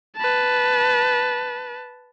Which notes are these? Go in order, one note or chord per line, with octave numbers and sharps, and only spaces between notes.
B4 A5